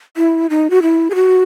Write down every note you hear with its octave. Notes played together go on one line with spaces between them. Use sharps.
E4
D#4
F#4
E4
G#4
F#4